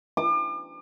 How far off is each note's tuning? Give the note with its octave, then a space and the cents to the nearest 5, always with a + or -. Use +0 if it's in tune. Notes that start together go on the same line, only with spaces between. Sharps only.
D6 +40